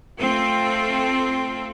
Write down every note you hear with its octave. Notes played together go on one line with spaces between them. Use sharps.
A3 C4 F4 A4